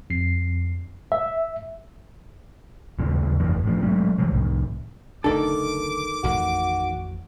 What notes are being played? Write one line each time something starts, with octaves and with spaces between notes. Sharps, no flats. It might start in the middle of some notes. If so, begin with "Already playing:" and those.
F2 C7
E5
D#2 A#2 C#3
G1 F2 E3 A#3
A2 F3
F#3 G#3 A3 C#4
E3 G3 G#3
C2 A2
F#1 D2 D#3 D4 A4 D6
D1 A1 F2 F#4